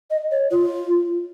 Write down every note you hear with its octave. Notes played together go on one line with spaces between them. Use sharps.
D#5
C#5
F4